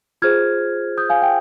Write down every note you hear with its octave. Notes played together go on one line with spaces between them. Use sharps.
F4 G#4 C5 F6 G#6
D#6 G6
F5 G#5
G5